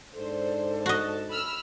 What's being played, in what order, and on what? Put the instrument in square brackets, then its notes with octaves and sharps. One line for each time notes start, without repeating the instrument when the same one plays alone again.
[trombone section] G#2 D4 [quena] A4 [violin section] C5
[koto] F#4 D#5 [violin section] A5
[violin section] B5 E6 F6